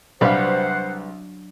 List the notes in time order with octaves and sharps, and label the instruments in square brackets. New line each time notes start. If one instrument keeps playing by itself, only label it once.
[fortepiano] C2 F5 [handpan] F#3 D4 [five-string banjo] G3 B4 [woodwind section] C5 F#5